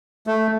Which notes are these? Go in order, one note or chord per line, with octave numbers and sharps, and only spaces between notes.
A3